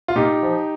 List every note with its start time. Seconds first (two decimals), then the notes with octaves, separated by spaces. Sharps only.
0.08 F4
0.15 A#2 D#4 G4
0.42 F3